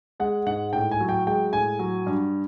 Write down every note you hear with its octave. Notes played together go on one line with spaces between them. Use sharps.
G#3 F#5
G#2 F#5
A2 G5
G#5
F#3
G5
G#3 G5
A2 G#5
F#3
G2